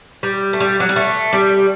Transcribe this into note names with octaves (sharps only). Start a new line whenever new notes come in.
G3
A3
G3
F#3
G3
A3
G3